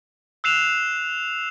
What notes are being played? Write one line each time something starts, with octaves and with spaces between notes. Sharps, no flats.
E6 F#6 C7 E7 F7